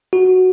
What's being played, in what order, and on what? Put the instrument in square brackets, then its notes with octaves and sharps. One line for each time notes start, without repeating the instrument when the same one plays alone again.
[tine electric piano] F#4